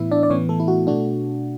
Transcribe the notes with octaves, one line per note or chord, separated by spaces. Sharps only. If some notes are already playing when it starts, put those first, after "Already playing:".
Already playing: A2 E3 B3 E4 E5
D4 D5
D5
A2 E3 B3 C#4 C#5
A3 A4
E4
F#4
B2 A3 D4 F#4